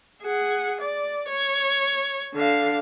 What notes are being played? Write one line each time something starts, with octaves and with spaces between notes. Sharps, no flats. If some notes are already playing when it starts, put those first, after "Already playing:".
G#4 F#5
D5
C#5
D3 F5